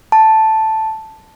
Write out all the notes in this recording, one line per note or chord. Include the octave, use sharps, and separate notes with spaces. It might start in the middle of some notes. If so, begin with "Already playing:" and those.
A5